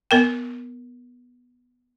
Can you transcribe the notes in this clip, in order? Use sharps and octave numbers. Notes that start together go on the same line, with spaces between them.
B3 A#4 G5